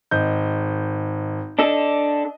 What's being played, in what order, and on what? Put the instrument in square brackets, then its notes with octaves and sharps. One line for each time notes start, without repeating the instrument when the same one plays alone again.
[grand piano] G#1 D#5 G6
[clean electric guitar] D4 A4 [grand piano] D#5